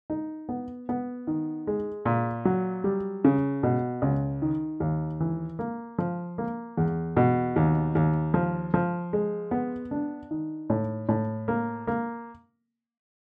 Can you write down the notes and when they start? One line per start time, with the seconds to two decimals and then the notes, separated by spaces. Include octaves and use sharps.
0.10 D#4
0.49 B3
0.89 B3
1.27 D#3
1.67 G#3
2.05 A#2
2.45 F#3
2.84 G3
3.24 C#3
3.63 B2
4.02 C#2
4.42 D#3
4.80 D#2
5.20 E3
5.59 A#3
5.99 F3
6.38 A#3
6.78 E2
7.17 B2
7.56 D#2
7.95 D#2
8.34 F3
8.74 F3
9.13 G#3
9.51 B3
9.91 D4
10.31 D#3
10.70 A2
11.09 A2
11.48 A#3
11.87 A#3